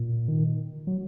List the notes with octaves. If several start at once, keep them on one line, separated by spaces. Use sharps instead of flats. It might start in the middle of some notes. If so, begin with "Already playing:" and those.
Already playing: A#2
D#3
F#3